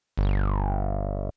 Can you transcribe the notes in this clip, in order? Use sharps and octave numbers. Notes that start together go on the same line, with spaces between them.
G1